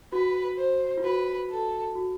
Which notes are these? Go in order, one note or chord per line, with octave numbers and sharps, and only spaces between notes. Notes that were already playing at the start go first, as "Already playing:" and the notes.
F#4 B4
C5
F4
F#4 B4
A4
F#4